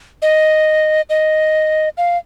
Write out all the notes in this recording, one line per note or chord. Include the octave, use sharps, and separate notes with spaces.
D#5
D#5
F5